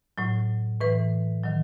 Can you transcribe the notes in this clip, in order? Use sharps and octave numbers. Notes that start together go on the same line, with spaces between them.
A2 F#3
A2 E3 B4
D#3 F#3